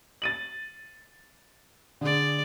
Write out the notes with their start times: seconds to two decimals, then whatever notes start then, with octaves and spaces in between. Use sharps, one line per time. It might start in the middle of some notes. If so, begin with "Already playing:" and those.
0.22 A6 D#7 F#7
2.01 D3 G#4 D5